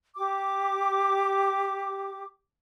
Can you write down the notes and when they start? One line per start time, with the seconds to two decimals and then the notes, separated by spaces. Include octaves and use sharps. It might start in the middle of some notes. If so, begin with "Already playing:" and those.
0.15 G4 D6